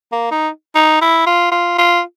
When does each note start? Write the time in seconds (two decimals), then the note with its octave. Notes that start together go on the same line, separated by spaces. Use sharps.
0.12 A#3
0.31 D#4
0.75 D#4
1.01 E4
1.26 F4
1.52 F4
1.78 F4